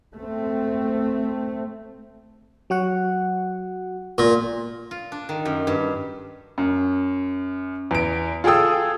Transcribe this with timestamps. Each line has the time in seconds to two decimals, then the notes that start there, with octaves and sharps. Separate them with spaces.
0.16 A3 C4
2.70 F#3 F#4 F#5
4.18 A#2
4.91 F4
5.12 D4
5.29 D#3
5.45 F#2
5.67 G2
6.58 F#2
7.91 E2 D7
8.44 F4 G#4 A4 G5 D#6 E6